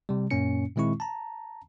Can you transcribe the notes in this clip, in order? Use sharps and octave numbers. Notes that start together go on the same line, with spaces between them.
C3 G3
F#2 A#2 A#3 C#4 C#7
A#2 D#3 G#3 C4 E4 C#6
A5 A#5